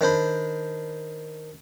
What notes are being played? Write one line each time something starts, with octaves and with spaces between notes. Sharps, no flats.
D#3 D4 C5 B5